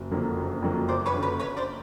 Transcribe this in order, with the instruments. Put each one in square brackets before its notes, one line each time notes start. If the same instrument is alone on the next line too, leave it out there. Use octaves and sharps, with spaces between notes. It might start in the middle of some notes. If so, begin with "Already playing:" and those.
Already playing: [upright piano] F#1
F2 D3 F#3 A#3
F#1
F2 D3 F#3 A#3
[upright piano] F#1 [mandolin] C5 D5
[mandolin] B4 C#5
[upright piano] F#2 D3
[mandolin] B4 C#5
[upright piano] F#1 [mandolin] B4 C#5
[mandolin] C5 D5